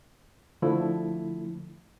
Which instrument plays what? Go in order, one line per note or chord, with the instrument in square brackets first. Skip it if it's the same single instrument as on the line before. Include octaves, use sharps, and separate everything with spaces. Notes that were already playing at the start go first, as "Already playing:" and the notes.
[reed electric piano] D3 F3 A3 E4